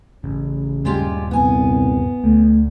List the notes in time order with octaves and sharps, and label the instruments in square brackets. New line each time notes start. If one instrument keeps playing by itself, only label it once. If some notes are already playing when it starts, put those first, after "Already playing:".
[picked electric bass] A1 [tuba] C#3
[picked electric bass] D#1 G2 G3 [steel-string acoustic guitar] G#3 F4 G4
[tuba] C2 [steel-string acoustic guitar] B3 G#5
[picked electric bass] D2 [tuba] A3